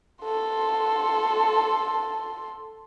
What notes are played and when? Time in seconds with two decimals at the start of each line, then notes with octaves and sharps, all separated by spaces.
0.25 A4 C6